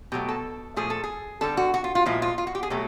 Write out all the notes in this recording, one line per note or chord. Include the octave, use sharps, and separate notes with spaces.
B2 F#3 A3 G4
A4
A#2 F3 A3 G#4
A4
G#4
D3 G3 A4
F#4
F#4
F4
F4
A#2 F3 G#3 E4
F4
F4
F#4
G4
G#4
B2 F#3 A3 G4